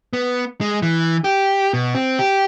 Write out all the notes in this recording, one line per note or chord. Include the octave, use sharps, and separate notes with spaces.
B3
G#3
E3
G4
B2
C4
G4